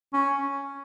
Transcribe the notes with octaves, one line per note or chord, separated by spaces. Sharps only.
C#4